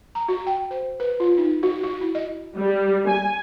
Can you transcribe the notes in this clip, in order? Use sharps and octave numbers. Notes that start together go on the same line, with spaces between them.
A#5
F#4
G5
C5
B4
F4
D#4
F#4
F#4
E4
D#5
G3
G#5